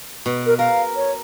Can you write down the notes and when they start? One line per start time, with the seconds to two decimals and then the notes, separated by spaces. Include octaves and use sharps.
0.26 B2
0.46 A#4
0.59 A#4 F5
0.96 C#5